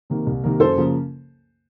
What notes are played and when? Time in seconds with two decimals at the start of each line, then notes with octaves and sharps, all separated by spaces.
0.10 C3 D#3 A#3
0.27 C2
0.44 C3 D#3 A#3
0.60 F#2 A4 C5
0.77 C#3 F3 A#3